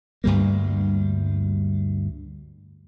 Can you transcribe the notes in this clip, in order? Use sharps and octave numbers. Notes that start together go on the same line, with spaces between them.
D2 G2 G3 A#3